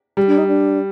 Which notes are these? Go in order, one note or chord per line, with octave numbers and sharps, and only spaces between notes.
G3
D4
D#4
D4